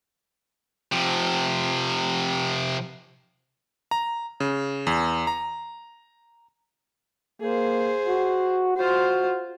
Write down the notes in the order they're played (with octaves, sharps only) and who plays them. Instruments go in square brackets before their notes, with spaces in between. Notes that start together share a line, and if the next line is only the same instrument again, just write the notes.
[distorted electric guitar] C3 F3
[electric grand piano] A#5
C#3
E2
A#5
[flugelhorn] A#3 [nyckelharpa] G#4 C5
[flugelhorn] F#4
[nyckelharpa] F4 C5 [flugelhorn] F#4